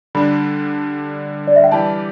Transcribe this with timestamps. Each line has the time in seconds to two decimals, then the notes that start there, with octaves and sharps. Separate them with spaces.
0.15 D3 G3 D4 B5
1.47 D5
1.56 E5
1.64 G5
1.71 E3 G3 E4 G4 D5 A5